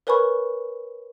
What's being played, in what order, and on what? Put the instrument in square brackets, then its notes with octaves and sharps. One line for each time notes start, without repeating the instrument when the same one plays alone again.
[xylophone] A#4 B4 C#5 G#5 B5 C#6